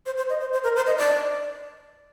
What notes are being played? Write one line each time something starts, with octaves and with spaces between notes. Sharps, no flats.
C5
C5
D#5
C5
C5
A#4
C5
D#5
D5